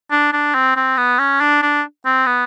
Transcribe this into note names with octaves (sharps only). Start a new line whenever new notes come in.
D4
D4
C4
C4
B3
C#4
D4
D4
C4
B3